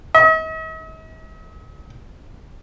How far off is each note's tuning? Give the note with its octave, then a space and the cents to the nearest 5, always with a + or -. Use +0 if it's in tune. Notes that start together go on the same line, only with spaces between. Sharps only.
D#5 +45